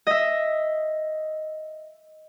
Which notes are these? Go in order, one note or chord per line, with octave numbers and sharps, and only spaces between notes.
D#5 E5